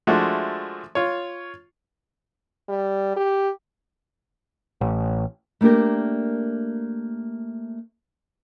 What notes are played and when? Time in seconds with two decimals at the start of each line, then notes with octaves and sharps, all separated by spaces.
0.07 F3 G#3 A3 D4 E4 F#4
0.95 F4 C#5
2.69 G3
3.16 G4
4.81 A1
5.61 A3 A#3 D4 G4 A#4